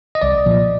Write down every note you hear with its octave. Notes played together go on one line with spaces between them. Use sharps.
D#5
C2 D5
A#2 F3